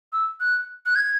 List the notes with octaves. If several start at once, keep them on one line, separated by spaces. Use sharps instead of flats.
E6
F#6
F#6
G#6